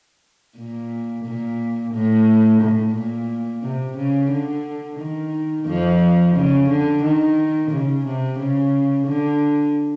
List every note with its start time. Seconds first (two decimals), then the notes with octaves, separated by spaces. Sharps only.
0.58 A#2
1.25 A#2
1.94 A2
2.62 A2
2.95 A#2
3.63 C3
3.97 C#3
4.31 D3
4.99 D#3
5.67 F2 F3
6.35 C#3
6.69 D3
7.03 D#3
7.71 C#3
8.05 C3
8.39 C#3
9.06 D3